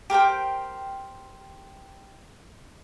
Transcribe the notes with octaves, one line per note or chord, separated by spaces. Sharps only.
G4 A#4 C5 G5